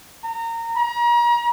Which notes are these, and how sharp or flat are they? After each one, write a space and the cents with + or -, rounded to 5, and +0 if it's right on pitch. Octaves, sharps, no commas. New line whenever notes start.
A#5 -20
A#5 +35